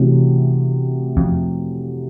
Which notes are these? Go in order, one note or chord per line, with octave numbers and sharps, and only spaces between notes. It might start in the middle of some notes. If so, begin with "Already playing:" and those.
Already playing: C3 E3 A3 C#4 F#4
F2